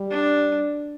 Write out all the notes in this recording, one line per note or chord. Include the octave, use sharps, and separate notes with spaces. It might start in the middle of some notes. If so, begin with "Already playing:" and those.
Already playing: G3
D4